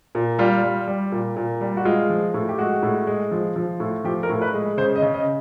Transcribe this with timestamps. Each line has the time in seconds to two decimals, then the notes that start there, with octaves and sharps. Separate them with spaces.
0.15 A#2
0.39 G3 F4
0.63 G3
0.88 G3
1.12 A#2
1.36 A#2
1.61 G3
1.77 F#4
1.85 G#3 F4
2.10 F3
2.34 A2
2.49 G4
2.58 G#3 F#4
2.83 A2
3.07 G#3
3.32 F3
3.56 F3
3.80 A2
4.04 F3 G4
4.23 A#4
4.29 A2
4.42 B4
4.53 G#3
4.77 C#3 C5
4.96 D#5
5.02 C#3
5.14 D#5